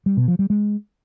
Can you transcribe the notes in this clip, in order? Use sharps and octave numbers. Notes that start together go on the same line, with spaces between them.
G3
B2
F3
G3
G#3